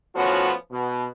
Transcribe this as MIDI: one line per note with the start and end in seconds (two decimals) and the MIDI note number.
0.15 0.52 45
0.15 0.52 53
0.15 0.52 59
0.15 0.52 61
0.15 0.52 66
0.72 1.06 47